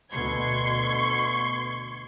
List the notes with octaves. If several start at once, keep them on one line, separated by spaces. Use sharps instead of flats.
D2 B2 C6 C#6 G#6